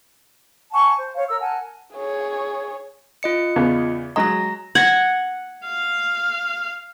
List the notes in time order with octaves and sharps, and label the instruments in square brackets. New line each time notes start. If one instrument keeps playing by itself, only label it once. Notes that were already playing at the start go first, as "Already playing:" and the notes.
[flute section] F#5 G#5 A5 C#6
C5
C#5 F5
A#4 E6
A#4 F#5 G#5 A5
[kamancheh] G#4 C#5
[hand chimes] F4 D#5 C#7
[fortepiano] E2 C#3 B3
[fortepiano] F#3 G#3 D#5 [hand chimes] A#5 A#6
[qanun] F#5 [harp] G#6 A#6
[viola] F5